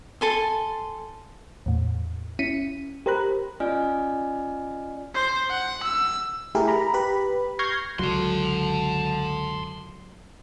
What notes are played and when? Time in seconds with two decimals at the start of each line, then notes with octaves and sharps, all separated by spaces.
0.21 A4 G#5 C6
1.66 E2 A2
2.39 C#4 E4 B6 C#7 D#7
3.06 G4 A#4 C5 A#5 B5 F#6
3.60 C#4 F4 D5 D#5 G#5 F6
5.14 C5
5.50 F#5
5.83 E6
6.55 A3 E4 G4 G#4 A#4
6.68 A#5 B5
6.94 G4 B4 B5
7.59 C#6 F6 G6 G#6 A#6 C7
7.99 C#2 F#2 D3 F#3 A5 C6